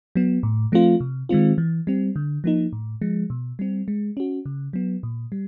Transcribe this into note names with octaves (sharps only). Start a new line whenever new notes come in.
F#3 B3
A2
F3 A3 C4 F4
C3
D#3 G#3 C4 F4
E3
G3 C4
D3
F3 A#3 D#4
A2
F3 G#3
B2
G3 C4
G#3
C#4 F#4
C#3
F#3 B3
A#2
G3